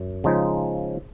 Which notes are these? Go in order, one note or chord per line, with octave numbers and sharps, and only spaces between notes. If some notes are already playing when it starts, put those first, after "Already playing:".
Already playing: F#2
C#3 F3 G#3 D#4